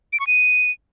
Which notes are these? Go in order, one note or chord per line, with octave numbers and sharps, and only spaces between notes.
D7
C#6
D#7